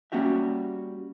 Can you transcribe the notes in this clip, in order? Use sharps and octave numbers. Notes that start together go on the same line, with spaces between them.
G3 A#3 C#4 F#4 G4 E5